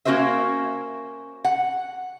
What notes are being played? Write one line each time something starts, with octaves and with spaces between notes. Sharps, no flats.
A#3 C#4 F#4 A#4 C5 E5
F#5